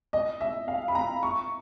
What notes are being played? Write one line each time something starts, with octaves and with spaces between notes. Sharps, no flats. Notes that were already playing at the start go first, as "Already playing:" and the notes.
D#5
E5
F5
B5
A#5
C#6